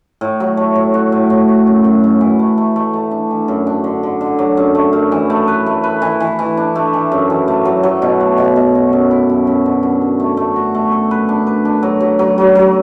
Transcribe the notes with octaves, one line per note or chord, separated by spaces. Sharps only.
A2
F#3
A3
A2
F#4
A2
A2
F#4
F#2
F#2
F#2
E3
A3
A3
A3
A3
D4
E3
F#2
D4
D3
D3
D3
F#3
F#2
A3
F#2
E3
A3
B4
A3
B4
E3
E3
E3
D4
A3
E3
F#2
E3
A3
F#3
F#3
B2
A3
B2
B2
F#4
F#2
E4
F#2
F#2
D3
F#2
F#2
A3
A3
F#4
A3
A4
B4
D4
B4
D4
F#3
F#3
F#3
F#3
F#3